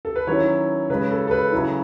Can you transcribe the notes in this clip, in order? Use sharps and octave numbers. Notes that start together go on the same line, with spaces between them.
A4
B4
D#3 F#3 C#4 E4 C#5
C#3 G#3 C#4 B4
A4
A4
B4
C#3 F#3 C#4 E4